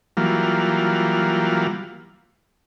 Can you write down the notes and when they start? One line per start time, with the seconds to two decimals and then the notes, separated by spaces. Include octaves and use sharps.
0.17 E3 F#3 G3 A#3 F4